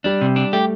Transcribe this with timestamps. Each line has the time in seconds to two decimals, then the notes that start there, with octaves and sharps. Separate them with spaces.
0.04 G3 D4
0.21 C3
0.36 D4
0.53 A3 G4